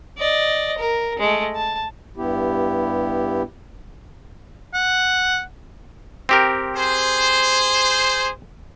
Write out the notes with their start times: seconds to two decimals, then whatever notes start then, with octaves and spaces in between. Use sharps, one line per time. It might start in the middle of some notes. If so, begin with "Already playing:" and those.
0.18 D5 D#5
0.78 A#4
1.19 G#3 A3
1.55 A5
2.17 G2 B3 E4 G4
4.74 F#5
6.29 C4 G4 A#4
6.76 G#4 C5